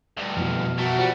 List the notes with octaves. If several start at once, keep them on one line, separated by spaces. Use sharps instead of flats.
D2 G2
F2 B2 E3 F6
A3 F#4 A#4
F3 G3 G4 C#7